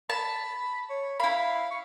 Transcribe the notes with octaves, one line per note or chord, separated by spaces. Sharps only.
A5 B5
C#5
E4 F5 B5
C#6